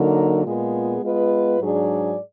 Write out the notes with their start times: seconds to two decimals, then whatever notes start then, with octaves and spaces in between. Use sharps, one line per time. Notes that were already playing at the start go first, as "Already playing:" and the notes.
Already playing: D3 F#3 A#3 D#4 A#4
0.44 A#2 G#3 B3 F4 G#4
1.01 G#3 B3 F4 B4 D#5
1.59 G#2 F#3 D4 G#4 D5